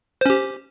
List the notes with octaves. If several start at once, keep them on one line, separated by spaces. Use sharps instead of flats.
C#4 G4 C5